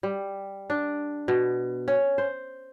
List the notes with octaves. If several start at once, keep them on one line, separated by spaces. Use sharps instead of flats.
G3
D4
B2
C#4
C5